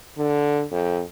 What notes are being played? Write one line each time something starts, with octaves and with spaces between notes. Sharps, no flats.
D3
F2